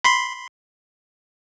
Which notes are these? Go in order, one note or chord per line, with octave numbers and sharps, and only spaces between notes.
B5 C6